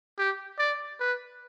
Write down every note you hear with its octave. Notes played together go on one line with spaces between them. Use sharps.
G4
D5
B4